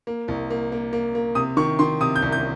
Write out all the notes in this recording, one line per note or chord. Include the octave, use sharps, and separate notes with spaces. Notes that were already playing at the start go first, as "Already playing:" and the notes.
A#3
C2
A#3
A#3
A#3
A#3
C3 D#6
D#3 C#6
D#3 C6
C3 D#6
G6
C2
G6